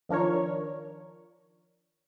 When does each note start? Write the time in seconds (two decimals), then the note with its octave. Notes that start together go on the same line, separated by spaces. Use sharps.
0.09 D#3 F3 D4 A#4 C#5